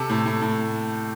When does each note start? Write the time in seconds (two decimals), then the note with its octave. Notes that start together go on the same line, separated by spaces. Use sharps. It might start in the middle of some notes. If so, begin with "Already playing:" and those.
Already playing: C3 A4
0.10 A2
0.26 A2
0.42 A2